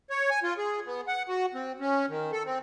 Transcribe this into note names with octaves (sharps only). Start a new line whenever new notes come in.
C#5
G#5
F4
G#4
B3
F#5
F#4
C4
C#4
D#3
A4
C4